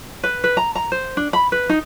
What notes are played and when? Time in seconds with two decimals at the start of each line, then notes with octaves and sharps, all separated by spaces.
0.23 B4
0.44 B4
0.57 A#5
0.75 A#5
0.92 C5
1.17 D4
1.33 B5
1.52 B4
1.69 D#4